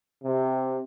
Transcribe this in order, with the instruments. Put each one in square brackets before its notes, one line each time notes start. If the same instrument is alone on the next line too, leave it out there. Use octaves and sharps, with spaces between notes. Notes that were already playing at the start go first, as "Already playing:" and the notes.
[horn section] C3